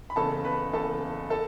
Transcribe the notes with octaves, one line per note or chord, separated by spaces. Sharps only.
B5
F#1 E2 C#3 A4 A5
B4 B5
F#1 E2 C#3 A4 A5
A4 A5